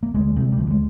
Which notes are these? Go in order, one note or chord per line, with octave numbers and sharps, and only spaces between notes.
A#3
D2 G#3
C3 G3
G3
D2 F3
G#3